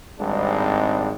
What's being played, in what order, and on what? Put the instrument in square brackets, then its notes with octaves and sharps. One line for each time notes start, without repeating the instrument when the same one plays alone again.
[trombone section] G#1 G#2 G3 G#3 C4 D4